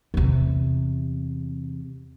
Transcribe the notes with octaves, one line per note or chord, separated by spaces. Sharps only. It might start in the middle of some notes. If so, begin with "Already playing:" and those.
E2 C3